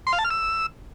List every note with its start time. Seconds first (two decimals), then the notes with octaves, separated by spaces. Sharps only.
0.07 C6
0.13 F5
0.19 A5
0.25 F6
0.30 E6